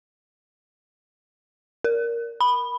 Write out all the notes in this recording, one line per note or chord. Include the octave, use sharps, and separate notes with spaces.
A#4
B5